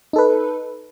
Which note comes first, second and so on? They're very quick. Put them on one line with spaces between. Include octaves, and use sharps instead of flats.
D#4 A4 B4